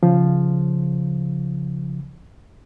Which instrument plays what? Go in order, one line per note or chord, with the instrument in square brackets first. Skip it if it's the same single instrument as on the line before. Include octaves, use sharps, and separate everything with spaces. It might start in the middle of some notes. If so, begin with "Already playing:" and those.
[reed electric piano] C#3 F3